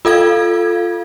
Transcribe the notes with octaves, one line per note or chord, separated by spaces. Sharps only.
F4 A4 F5 G#6